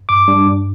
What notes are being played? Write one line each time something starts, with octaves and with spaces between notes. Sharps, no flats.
G2 D6
G3 D4
G2